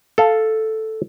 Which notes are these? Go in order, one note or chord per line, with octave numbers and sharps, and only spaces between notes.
A4 F5